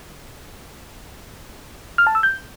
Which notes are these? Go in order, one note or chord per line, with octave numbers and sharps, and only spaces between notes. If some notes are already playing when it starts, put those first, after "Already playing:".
F6
A5
E6
G6